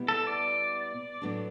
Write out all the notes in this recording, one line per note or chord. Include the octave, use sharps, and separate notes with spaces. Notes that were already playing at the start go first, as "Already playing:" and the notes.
Already playing: B2 G3 B3 E4
A4
D5
A2 F#3 B3 D4